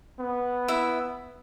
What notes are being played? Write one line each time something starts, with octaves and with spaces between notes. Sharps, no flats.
B3
E4 E5